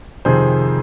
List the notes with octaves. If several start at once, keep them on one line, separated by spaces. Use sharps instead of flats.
F2 C3 D#3 G#4 C5